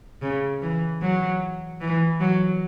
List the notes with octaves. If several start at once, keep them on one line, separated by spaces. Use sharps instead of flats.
C#3
E3
F#3
E3
F#3